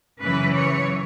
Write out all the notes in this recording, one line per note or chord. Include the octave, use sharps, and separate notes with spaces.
F#2 C#3 E3 B4
C#5